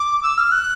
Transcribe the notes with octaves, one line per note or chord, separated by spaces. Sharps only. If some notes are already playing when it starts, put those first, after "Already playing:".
Already playing: D6
E6
F6
F#6